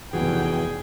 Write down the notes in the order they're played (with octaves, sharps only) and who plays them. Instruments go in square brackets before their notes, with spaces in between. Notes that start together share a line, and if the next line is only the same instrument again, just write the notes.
[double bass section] F1 E2 B2 [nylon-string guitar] E3 F#4 [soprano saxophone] G#4 [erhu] G5